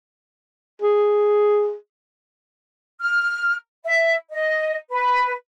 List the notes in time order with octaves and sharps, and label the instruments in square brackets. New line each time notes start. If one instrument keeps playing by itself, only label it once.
[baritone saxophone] G#4
[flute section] F6
E5
D#5
B4